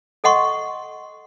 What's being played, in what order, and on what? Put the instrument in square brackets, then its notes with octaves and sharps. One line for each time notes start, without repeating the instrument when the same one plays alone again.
[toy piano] A4 D#5 F#5 C6 C#6